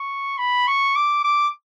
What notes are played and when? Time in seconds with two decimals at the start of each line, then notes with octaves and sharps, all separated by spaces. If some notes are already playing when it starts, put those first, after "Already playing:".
Already playing: C#6
0.38 B5
0.67 C#6
0.96 D6
1.24 D6